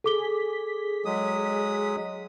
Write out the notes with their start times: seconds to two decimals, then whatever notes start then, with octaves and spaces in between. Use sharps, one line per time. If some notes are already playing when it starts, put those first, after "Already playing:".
0.04 G#4 A4 D6 B6 G7
1.05 F#3 G#3 D#6